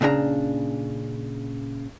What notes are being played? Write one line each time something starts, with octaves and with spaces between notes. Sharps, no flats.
A#2 C#3 D4 C5 A#5